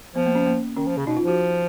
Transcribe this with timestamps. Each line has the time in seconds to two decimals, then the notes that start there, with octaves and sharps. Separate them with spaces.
0.15 F3 B3
0.26 A#3
0.35 C#4
0.46 A#3
0.77 D#3 C#4
0.87 F3
0.97 C#3
1.06 B2 D#4
1.17 F4
1.22 F3
1.28 F#4